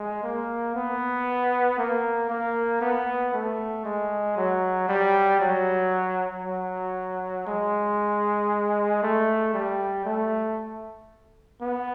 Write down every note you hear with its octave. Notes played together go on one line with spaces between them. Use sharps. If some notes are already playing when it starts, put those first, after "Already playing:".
Already playing: G#3
A#3
B3
A#3
A#3
B3
A3
G#3
F#3
G3
F#3
F#3
G#3
A3
G3
A3
B3